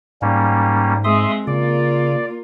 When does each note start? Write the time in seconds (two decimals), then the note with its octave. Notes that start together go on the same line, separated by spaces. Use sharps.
0.22 G#2 G3 A#3 C#4
1.04 G#3 C4 E5 C6 D#6
1.47 C#3 A#3 F4 D5